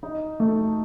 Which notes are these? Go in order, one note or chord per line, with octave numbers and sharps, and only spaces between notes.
D#4
A3